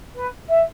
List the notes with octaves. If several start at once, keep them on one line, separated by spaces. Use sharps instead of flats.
B4
E5